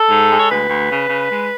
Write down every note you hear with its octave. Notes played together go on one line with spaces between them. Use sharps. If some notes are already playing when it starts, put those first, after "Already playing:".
Already playing: A4
G#2
G#3
C#5
D2 B4
D2
C#3
C#3
G#3